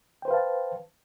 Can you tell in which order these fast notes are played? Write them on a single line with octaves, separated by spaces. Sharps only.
G5 C5 B4 F5 A5